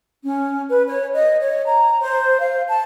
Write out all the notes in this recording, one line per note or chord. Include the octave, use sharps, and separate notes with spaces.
C#4
B4
C#5
D#5
C#5
A#5
C5
F5
A5